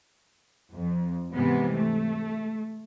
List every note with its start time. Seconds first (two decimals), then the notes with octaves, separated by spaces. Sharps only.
0.76 F2
1.34 G#2 C3 E3 B3
1.74 A3